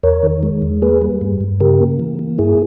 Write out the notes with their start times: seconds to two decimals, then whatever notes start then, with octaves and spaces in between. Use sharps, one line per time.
0.03 E2 A#4 C#5
0.23 D#3
0.43 G#3
0.62 E2
0.82 A#3 G#4 B4
1.02 G3
1.21 G2
1.41 G2
1.60 C#3 G4 A#4
1.80 A#3
1.99 E3
2.19 A#3
2.38 G2 E4 G#4